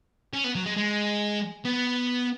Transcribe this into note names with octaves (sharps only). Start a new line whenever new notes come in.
C#4
B3
F#3
G#3
G#3
B3